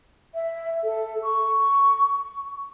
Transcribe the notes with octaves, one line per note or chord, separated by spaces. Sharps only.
E5
A4
C#6